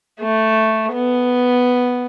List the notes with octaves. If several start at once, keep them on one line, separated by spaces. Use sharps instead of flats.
A3
B3